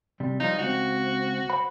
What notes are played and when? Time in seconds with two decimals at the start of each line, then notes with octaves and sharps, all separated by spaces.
0.20 C3 G3
0.40 F3 G3 D#4 F4
0.59 C#2 C4 F#4
1.50 C5 F#5 B5